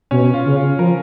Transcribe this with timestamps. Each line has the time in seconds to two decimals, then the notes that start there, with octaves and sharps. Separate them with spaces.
0.11 B2 C#4
0.34 F4
0.46 C#3
0.56 F4
0.78 F3 A#4